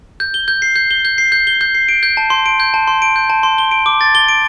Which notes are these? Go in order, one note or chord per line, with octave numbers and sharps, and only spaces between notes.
G6
G7
G6
C7
G6
G7
G6
C7
G6
G7
G6
C7
D7
G6
A5
C6
D7
G6
A5
C6
D7
G6
A5
C6
G7
D7
D6
A6
G7
D7